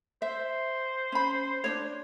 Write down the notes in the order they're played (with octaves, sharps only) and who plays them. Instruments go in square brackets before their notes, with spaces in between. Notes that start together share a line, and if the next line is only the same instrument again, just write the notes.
[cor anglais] C5 [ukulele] E5
[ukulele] C#4 B5
D4 D#4 C#5